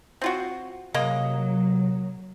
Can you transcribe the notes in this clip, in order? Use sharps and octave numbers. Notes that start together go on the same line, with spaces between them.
C4 F4 F#4
C3 F#3 G#3 A#3 D#5